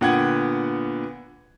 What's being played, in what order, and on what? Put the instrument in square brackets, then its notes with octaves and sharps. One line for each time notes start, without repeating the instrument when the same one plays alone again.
[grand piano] A#2 D3 B3 F#5 G5 G#6